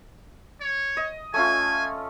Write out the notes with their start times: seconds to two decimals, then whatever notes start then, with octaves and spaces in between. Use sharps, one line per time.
0.61 C#5
0.97 D#5
1.34 A3 C#4 F4 G#5